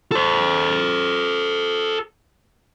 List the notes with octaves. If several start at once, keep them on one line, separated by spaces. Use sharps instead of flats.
A4 C5